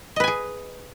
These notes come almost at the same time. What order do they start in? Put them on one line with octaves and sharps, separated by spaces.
D#5 B4 G#5 G#4